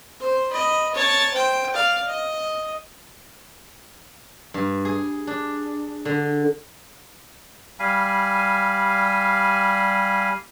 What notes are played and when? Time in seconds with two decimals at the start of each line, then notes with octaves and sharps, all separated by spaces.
0.20 C5
0.49 D#5 B5
0.95 C#5 A5
1.33 C5 G5
1.73 D5 F5
2.07 D#5
4.54 G2
4.85 G#4
5.27 D4
6.05 D3
7.80 G3 F5 G#5 B5